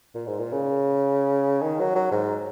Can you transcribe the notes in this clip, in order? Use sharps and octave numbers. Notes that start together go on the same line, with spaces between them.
A#2
G#2
A#2
C#3
D#3
F#3
F#3
G#2